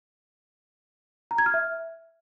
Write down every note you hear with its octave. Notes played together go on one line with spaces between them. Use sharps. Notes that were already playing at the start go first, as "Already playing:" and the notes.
A#5
G#6
F6
E5